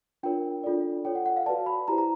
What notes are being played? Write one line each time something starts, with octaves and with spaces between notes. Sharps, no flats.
D4 F4 A#4 C#5 G5
D4 F4 A4 D5
F4 A4 C#5 G5
F#5
F#5
F5
F#4 B4 D5 A5
B5
E4 G4 C5 A#5
A#5